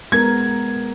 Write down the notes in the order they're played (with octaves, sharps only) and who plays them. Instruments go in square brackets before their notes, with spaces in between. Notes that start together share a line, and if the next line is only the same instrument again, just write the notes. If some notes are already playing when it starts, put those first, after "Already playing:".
[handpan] G#3 B3 A#4 [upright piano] G#6